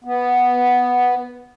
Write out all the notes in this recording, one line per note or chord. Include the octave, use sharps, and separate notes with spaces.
B3